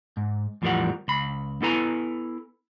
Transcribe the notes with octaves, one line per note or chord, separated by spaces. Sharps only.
G#2
E2 A2 F3 G3 A#4 F#5
C#2 B5
B3 E4 A4 B4 G#5 A#5